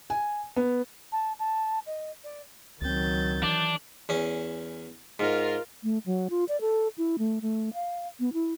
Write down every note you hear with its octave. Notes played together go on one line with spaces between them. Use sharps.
G#5
B3
A5
A5
D#5
D5
C#2 D#3 F#3 C4 G6 A6
E3 D4
E2 C#4
G#2 F4 A#4
A3
F#3
F4
D5
A4
E4
A3
A3
F5
B3
E4